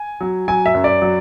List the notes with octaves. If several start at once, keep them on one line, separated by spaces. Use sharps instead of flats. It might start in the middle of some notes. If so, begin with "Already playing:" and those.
Already playing: G#5
F#3
F#3 G#5
E5
F#2
D5
F#3